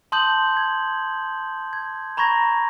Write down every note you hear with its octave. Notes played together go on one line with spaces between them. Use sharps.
A5 C6 D#6 G6 F#7
G#6
G#6
A#5 B5 C#6 G#6 A#6